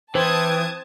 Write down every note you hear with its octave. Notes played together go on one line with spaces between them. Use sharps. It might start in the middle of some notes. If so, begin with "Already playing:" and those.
E3 C5 G5 A5 D#6 G#6